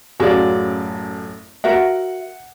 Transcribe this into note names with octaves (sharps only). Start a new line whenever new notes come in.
A1 F#2 F4 F#4 G#4 D5
F#4 A#4 E5 F#5